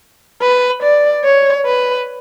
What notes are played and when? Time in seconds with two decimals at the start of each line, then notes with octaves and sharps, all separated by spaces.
0.42 B4
0.83 D5
1.24 C#5
1.65 B4